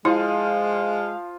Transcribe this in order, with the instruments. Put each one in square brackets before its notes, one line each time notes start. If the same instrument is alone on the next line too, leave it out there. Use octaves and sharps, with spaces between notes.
[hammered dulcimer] F3 [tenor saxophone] G#3 [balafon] E4 [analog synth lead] F5